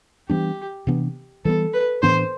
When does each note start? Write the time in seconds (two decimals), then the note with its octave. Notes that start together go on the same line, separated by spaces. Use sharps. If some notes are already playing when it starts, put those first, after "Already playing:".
0.29 E3 G3 B3 D4 G4
0.87 C3 E3 B3 D4
1.45 E3 G3 B3 A4
1.74 B4
2.02 A2 E3 B3 D4 C5